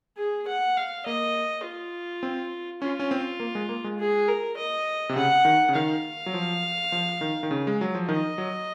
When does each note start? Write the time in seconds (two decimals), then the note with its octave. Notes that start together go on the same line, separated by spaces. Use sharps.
0.17 G#4
0.47 F#5
0.76 F5
1.06 A#3 D#5
1.64 F4
2.23 C4
2.81 C#4 F4
2.99 C#4
3.11 C4
3.40 A#3
3.55 G#3
3.69 A#3
3.84 G#3
3.99 G#4
4.28 A#4
4.57 D#5
5.09 C3
5.15 C#3 F#5
5.45 D#3
5.69 C#3
5.75 D#3 F5
6.26 F#3
6.34 F3
6.92 F3
7.21 D#3
7.43 D#3
7.51 C#3
7.67 G#3
7.81 F#3
7.95 F3
8.08 D#3 D#5
8.38 F#3